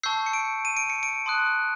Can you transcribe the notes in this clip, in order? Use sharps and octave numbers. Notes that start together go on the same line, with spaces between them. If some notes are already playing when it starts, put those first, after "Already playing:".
A5 C#6 E6 G6 C7
C#7
D7
D#7
D7
C#7
D7
A5 C6 D#6 F#6